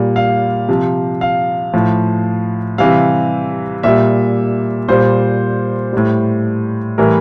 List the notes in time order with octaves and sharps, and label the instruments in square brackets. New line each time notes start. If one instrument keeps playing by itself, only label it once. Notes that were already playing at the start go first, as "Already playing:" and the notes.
Already playing: [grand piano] A#2 G3
F5
C3 F3
F5
A2 F3
C3 E3 G3 F5
A#2 G3 E5
A#2 G3 C5
A2 G3
A2 E3 G3 A#4